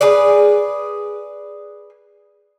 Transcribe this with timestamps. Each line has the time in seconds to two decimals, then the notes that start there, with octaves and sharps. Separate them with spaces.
0.01 G#4 B4 D5